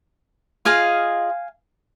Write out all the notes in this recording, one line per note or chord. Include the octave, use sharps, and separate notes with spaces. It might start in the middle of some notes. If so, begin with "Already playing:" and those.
F4 G#4 D#5 F5 G#5